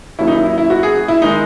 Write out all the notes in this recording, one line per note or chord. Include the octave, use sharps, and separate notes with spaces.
D#2 C#3 F#3 A#3 E4
D#4
E4
E4
E4
F#4
G#4
E4
D#3 G#3 D#4